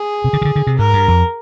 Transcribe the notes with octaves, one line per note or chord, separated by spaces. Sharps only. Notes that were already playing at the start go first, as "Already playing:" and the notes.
Already playing: G#4
C3
D3
D#3
D3
D3
C3
G#2 A#4
G2
F2